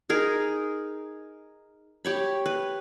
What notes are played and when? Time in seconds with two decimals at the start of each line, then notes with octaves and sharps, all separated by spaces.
0.09 D#4 G#4 A#4
2.05 G4 C#5 B5
2.46 B4